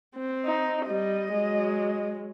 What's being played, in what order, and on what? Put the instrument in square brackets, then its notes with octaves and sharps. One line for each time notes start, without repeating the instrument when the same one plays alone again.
[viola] C4
[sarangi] D#4
[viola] G3 [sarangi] D#5
[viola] F#3 G#3